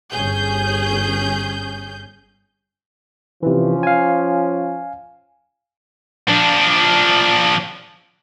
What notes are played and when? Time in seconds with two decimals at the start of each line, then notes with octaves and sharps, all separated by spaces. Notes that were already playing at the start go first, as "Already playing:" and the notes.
0.12 G1 C#4 G#4 G6
3.43 C3 E3 F3 C#4
3.83 F5 G#5
6.28 F3 D4